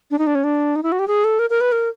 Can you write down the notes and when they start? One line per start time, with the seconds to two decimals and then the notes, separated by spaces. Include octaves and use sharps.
0.11 D4
0.19 D#4
0.27 D4
0.35 C#4
0.44 D4
0.76 D#4
0.83 E4
0.92 F#4
0.99 G4
1.08 G#4
1.24 A4
1.39 A#4
1.50 A#4
1.61 B4
1.72 A#4